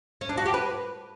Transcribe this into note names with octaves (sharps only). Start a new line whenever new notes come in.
C#4
D4
F#4
G4
B4